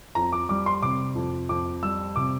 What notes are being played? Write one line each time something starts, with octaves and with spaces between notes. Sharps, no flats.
F2 A#5
D6
G3 D6
C6
C3 D6
F2
F2 D6
G3 E6
C3 D6